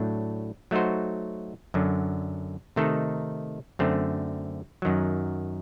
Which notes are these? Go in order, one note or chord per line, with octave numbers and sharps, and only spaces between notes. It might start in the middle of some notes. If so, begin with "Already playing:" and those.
Already playing: A2 F#3 A3 D4
F#3 A3 D#4 F#4 C5
F#2 D3 F#3
C3 D#3 A3 D#4 A4
F#2 D3 A3 C4
F#2 D#3 F#3